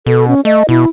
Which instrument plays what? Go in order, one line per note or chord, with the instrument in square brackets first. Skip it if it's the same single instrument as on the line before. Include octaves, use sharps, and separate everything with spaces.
[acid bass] B2 [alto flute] A4
[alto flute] C#4
[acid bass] A3 [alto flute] D#5
[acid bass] B2 [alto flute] E4